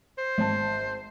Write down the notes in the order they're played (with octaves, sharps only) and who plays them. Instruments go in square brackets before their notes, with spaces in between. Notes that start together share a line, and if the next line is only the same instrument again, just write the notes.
[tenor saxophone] C5
[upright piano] G#1 A5